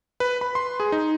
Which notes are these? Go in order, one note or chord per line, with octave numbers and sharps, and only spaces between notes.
B4
B5
C6
G#4
D#4